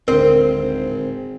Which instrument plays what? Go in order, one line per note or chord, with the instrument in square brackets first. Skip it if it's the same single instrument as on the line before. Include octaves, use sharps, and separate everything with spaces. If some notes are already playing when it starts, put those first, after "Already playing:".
[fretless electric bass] D1 D3 [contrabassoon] G#1 [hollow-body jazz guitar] C4 [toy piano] A#4